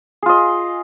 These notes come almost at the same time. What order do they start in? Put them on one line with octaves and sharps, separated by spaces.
G#4 F4 D#5